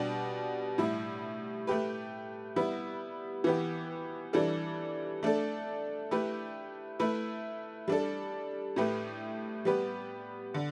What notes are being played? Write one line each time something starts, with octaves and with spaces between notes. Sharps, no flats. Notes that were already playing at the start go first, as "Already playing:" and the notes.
Already playing: B2 G3 D4 G4
A2 G3 E4
A3 G4 B4
G3 B3 E4
E3 B3 G4
E3 G3 D4 A4
A3 D4 A4
A3 E4 G4 B4
A3 E4 B4
G3 D4 A4
A2 A3 G4 B4
G3 B3 G4 B4
D3